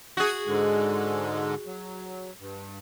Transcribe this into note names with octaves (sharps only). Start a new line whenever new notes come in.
F#4 G#4
G#2 D3 G#3
F#3
G2